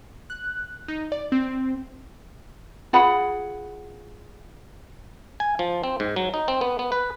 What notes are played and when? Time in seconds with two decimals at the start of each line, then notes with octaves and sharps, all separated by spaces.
0.30 F#6
0.88 D#4
1.12 D5
1.32 C4
2.93 F4 G#4 F#5 B5
5.40 G#5
5.59 F3
5.84 C4
6.00 G#2
6.16 F#3
6.34 D#4
6.48 C4
6.61 B3
6.79 B3
6.92 B4